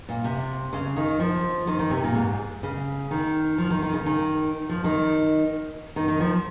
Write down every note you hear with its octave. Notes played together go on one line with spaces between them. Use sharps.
A#2
C3
C#3
D#3
F3
D#3
D#3
C3
A#2
G#2
C#3
D#3
F3
D#3
D#3
C#3
D#3
F3
D#3
D#3
D#3
F3